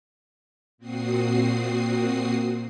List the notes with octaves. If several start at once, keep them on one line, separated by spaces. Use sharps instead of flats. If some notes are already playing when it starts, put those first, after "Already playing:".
A#2 C4 F#4 D#6 C7